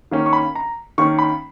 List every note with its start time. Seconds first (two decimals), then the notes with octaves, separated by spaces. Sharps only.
0.11 D#3 A#3 C#4
0.26 C#6
0.33 B5
0.55 A#5
0.98 D#3 A#3 C#4 C#6
1.19 B5